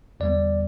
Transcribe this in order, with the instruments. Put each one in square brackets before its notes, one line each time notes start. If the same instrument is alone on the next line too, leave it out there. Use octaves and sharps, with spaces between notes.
[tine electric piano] E2 D3 G3 B3 D5